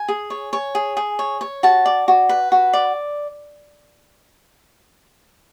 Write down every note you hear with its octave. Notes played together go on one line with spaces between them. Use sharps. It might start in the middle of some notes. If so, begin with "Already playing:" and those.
Already playing: G#5
G#4
C#5
C#5
G#4
G#4
C#5
C#5
F#4 A5
D5
F#4
B4
F#4
D5